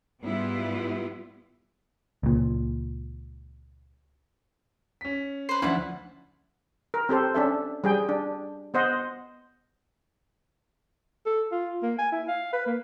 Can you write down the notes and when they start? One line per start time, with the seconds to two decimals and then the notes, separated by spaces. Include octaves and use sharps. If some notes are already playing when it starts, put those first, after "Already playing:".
0.23 G#2 G3 B3 E4 F4
2.23 C#2 A#2
5.01 C#4 B6
5.49 B4 C5 C7
5.62 D2 F3 C#4 E4 D5 F#5
6.94 A#4
7.09 C4 G4 A4 C5
7.34 C#4 D4 A4 E5
7.84 G3 G#4 G5
8.09 D4
8.74 B3 C5 D#5 F#5
11.26 A4
11.52 F4
11.82 A#3
11.98 G#5
12.12 E4
12.28 F5
12.53 B4
12.66 A#3